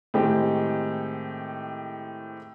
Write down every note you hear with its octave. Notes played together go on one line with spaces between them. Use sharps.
A2 D#3 G#3 C4 G4